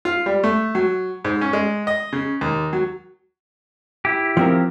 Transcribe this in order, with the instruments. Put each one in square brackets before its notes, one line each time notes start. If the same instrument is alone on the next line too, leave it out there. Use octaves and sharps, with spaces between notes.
[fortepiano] F4
G3
A3
F#3
G#2
C#4
G#3
D#5
C#3
D#2
F#3
[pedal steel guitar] E4 G4
[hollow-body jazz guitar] F3 C4 A#4